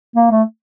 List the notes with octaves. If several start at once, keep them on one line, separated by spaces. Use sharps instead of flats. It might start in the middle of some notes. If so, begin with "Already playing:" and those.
A#3
A3